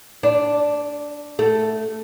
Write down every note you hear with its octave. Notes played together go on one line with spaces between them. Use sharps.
D4
A3